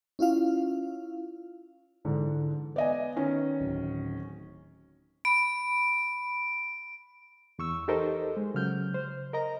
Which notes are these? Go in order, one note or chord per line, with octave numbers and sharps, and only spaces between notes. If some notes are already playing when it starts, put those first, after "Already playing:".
C#4 E4 F4 F5
G#2 D3 E3
B3 D5 D#5 G#5
D#3 C#4
D1
B5 D7
E2 C#6 E6
D#4 G4 A4 A#4 C5 D#5
G#3
C#3 F#3 F6 G6
C5
A#4 D#5 A#5